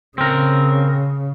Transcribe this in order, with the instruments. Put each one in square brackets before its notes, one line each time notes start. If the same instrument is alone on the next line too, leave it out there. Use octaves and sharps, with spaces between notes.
[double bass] C#3 [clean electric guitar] C4 A#4